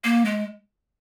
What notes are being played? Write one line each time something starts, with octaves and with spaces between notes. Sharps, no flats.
A#3
G#3